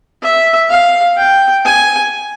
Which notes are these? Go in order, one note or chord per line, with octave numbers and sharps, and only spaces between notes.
E5
F5
G5
G#5